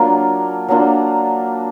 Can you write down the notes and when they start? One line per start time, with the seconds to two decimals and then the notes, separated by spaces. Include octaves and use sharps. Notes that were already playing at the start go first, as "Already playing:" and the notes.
Already playing: F#3 A#3 D4 F4
0.68 F#3 A#3 D4 F4